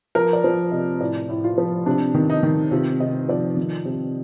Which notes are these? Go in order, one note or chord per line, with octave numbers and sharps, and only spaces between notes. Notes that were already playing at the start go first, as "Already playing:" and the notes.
F3 A#4
D5
F3 C5
C3 D#5
A2 D5
A2
F4
F3
C3 D4
D#3
D#4
D#3
C3 F4
C3 D#5
F3 D5
D#3
C3